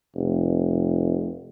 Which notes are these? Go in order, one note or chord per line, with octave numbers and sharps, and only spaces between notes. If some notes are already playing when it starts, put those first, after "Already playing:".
F1